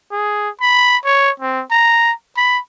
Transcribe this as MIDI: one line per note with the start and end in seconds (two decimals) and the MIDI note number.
0.12 0.49 68
0.62 0.97 83
1.05 1.30 73
1.40 1.63 60
1.71 2.12 82
2.37 2.59 83